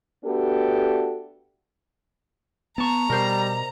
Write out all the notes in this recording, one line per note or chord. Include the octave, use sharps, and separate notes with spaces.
A3 B3 D4 F#4 G4 A4
B3 A5 A#5 C#6
B2 G3 A#4 C5